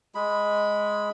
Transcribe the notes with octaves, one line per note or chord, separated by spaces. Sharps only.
G#3 B5